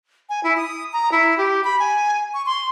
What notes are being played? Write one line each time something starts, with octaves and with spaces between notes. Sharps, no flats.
G#5
E4
D#6
A#5
E4
G4
B5
G#5
C#6
C6